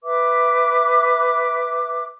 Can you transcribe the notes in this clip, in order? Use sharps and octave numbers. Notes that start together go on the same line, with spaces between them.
B4 E5 D6